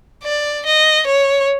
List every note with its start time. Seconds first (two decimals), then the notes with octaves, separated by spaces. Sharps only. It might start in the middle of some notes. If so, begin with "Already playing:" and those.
0.24 D5
0.66 D#5
1.07 C#5